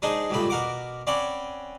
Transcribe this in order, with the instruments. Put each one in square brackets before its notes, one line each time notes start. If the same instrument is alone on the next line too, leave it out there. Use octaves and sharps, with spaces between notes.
[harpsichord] G#3 D4 D#4 G#4 C5
C#2 G2 A#2 A3 B5
B2 A#4 F#5 D6
C4 C#4 D5 F#5 B5